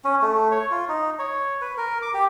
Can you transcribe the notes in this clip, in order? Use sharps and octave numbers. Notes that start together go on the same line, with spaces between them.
C#4
A3
C#5
F4
D#4
C#5
B4
A#4
D6
G4